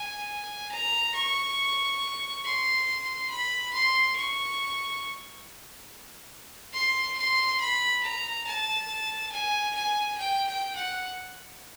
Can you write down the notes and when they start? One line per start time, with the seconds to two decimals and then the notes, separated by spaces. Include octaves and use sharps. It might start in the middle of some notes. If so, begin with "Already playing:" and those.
Already playing: G#5
0.72 A#5
1.15 C#6
2.44 C6
3.30 B5
3.73 C6
4.16 C#6
6.73 C6
7.17 C6
7.60 B5
8.03 A#5
8.47 A5
9.32 G#5
9.75 G#5
10.18 G5
10.47 G5
10.75 F#5